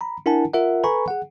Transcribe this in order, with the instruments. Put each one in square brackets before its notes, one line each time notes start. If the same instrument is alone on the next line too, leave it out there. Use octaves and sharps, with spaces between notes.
[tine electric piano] A#5 B5
D4 E4 A#4 F#5 G#5 A5
F4 A#4 E5 F#5
A4 B4 G#5 A#5 B5 C#6
G#4 F#5